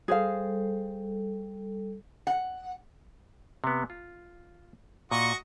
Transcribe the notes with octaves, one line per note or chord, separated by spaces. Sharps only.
G3 G#4 A4 C5 F5
F#5
C3 B3
F4
A#2 F#4 D#5 C#6